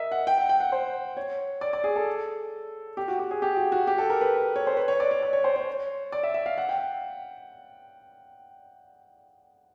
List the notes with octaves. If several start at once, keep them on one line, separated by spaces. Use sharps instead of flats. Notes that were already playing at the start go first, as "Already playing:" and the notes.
Already playing: A#4 D#5 E5
F#5
G5
F#5
G5
F#5
C5
C#5
D5
D5
G#4
A4
G4
F#4
G4
G#4
G4
F#4
F#4
G4
A4
A#4
B4
C#5
C5
B4
C#5
D5
C#5
D5
C#5
C5
C#5
D5
E5
E5
F5
F#5
G5